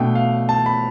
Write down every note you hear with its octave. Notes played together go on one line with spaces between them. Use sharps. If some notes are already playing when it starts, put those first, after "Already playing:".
Already playing: B2 A3 D4 G5
F5
A5
B5